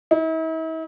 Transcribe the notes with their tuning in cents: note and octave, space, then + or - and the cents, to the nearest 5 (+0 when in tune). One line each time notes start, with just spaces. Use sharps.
E4 -45